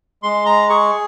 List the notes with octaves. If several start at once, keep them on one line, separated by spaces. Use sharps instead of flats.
G#3 C6
A#5
G#4 C#6